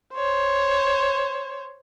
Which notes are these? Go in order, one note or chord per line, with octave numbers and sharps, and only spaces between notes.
C5 C#5